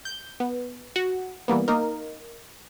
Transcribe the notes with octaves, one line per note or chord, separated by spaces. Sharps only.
G6
B3
F#4
E3 G3 A#3 B3
A#3 D#4 A#4